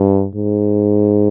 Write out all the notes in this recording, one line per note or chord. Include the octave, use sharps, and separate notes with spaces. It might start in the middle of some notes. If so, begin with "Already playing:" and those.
Already playing: G2
G#2